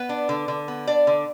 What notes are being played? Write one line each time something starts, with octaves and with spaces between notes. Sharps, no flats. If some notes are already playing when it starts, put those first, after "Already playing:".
Already playing: B3 B4
D4
D3
D3
B3
D4 D5
D3